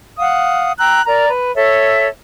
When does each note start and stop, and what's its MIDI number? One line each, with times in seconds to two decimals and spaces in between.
0.18 0.72 77
0.18 0.72 78
0.18 0.72 87
0.78 1.01 79
0.78 1.01 82
0.78 1.01 88
0.78 1.01 90
1.06 1.28 70
1.06 1.28 74
1.06 1.28 82
1.29 1.53 71
1.55 2.07 69
1.55 2.07 73
1.55 2.07 76